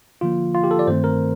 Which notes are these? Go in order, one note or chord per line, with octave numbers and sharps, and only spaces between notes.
D3 F3 A#3 F4
F4
G4
A4
D5
G2 D#3 A3 C4 C5
A#4